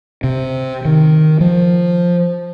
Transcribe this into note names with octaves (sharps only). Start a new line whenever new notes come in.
C3
D#3
F3